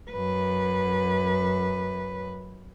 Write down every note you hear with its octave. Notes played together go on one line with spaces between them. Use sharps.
F#2 B4